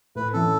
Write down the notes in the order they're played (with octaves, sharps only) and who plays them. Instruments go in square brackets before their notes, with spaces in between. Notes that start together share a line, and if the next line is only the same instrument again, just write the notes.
[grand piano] A2 [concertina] B4
[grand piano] E3 C#4 [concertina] A4